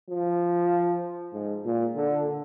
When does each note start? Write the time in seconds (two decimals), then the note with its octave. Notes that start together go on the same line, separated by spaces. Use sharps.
0.09 F3
1.33 G#2
1.65 A#2
1.96 D3